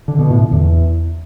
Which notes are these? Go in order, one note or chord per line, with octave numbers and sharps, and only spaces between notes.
D3
B2
A2
D3
E2